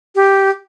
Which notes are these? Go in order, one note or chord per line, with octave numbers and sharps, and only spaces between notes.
G4